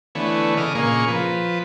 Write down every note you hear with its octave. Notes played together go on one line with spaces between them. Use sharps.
D3 E3 A3 B3 C#5
C#3 D#5 D6 F6
A#2 C#3 A#3 G#4 C#6
F3 B4